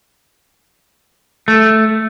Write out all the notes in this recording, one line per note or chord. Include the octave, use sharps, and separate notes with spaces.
A3